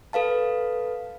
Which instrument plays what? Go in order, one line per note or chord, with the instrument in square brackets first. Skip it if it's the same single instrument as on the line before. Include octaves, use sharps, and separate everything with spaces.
[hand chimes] A4 B4 F5 A5